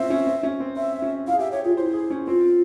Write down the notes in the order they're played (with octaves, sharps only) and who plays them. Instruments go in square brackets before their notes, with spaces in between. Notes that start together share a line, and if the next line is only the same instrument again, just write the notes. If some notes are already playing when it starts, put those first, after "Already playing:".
Already playing: [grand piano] C4 C#4 E4 F4 [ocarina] E5
[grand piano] C#4
C4
C#4
C4
[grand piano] C4 [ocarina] E5
[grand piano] C#4
[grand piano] E4 [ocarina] F5
[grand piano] G#4
[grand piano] G4 [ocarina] E5
[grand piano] G4 [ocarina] C#5
[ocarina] F4 [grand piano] G#4
[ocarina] F4 [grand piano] C5
[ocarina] E4
[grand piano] G#4
C#4
[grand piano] C4 [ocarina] F4